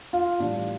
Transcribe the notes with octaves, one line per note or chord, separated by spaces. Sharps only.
F4
A2 E3 G3 D4